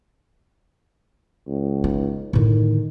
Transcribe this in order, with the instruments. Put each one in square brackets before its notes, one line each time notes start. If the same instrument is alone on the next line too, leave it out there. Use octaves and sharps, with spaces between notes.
[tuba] C#2
[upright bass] D#4
[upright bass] A2 D3 [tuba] D#3